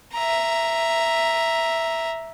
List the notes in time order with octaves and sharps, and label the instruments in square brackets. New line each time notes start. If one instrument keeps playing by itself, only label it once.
[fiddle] E5 A#5